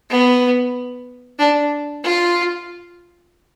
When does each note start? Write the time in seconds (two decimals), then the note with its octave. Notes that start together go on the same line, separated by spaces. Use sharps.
0.10 B3
1.39 D4
2.04 F4